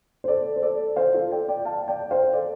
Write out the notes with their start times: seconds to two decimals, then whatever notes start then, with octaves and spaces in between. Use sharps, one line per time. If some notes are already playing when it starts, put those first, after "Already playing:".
0.24 C5
0.28 A4 D5
0.56 C5
0.62 A4 D5
0.96 C5 F5
1.14 F4 A4
1.31 D5 G5
1.49 D5 G5
1.65 F5 A5
1.88 D5 G5
2.11 C5 F5
2.33 A4 D5